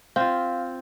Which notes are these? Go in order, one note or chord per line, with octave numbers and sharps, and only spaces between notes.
C4 F4 F5